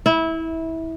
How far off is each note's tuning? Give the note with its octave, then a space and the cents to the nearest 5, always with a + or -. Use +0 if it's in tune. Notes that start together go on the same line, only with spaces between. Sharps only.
E4 -20